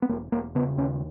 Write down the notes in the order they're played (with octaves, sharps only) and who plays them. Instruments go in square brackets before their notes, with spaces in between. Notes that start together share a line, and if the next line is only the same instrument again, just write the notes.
[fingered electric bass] B3
E1 A#3
E1 A#3
C#3 B3
D#2 C#4